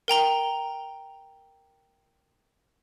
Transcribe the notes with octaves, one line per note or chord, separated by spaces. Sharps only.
A#4 G5 A#5 G7